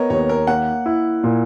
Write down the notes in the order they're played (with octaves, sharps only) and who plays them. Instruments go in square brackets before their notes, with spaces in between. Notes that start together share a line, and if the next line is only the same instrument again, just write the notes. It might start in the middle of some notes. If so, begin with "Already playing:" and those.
Already playing: [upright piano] B3 [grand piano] A#4 C#5 D#5
[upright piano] D#2 [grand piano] C#5
[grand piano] A#4
[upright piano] A#3 [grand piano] F#5
[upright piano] E4
A#2